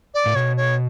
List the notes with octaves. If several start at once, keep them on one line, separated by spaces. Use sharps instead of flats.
D5
A2
B2 C#5
C#5